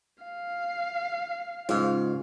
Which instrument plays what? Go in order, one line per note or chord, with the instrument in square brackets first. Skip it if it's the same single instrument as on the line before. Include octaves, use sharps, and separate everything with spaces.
[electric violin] F5
[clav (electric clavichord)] G#2 [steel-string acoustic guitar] C#3 F5 [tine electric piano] F4